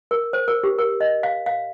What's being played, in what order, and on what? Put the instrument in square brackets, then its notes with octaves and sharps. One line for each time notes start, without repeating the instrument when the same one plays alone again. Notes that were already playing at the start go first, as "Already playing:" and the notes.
[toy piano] A#4
C5
A#4
G4
A#4
D#5
F5
F5